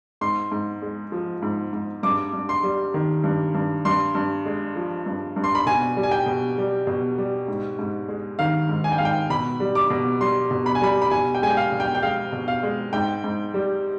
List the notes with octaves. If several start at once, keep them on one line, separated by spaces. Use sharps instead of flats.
G#2 C6
G#2
G#3
F3
G#2
G#2
G2 D6
G2
C6
G3
D#3
G2
G2
G2 C6
G2
G#3
F3
G2
G2
C6
B5
B2 G#5
G3
G#5
G5
B2
G3
B2
G3
G#2
G#2
G#3
D#3 F5
G#2
G#5
G5
G#2 F5
G5
B2 B5
G3
D6
B2
G3 C6
B2
B5
G#5
G3 B5
B5
B2 G#5
G5
G#3 G#5
G5
F5
B2
G5
G5
G#3 F5
B2
F5
G#3
G#2 G5
G#2
G3